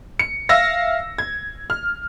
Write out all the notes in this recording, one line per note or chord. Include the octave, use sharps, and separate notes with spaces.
C#7
E5 F5 E6 A#6
G#6
F6